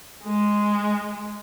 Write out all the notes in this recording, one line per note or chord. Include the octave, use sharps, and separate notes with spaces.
G#3